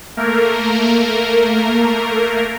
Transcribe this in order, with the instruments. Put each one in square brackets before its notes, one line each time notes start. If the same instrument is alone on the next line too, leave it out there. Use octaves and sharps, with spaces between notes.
[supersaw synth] A3 A#3 A#4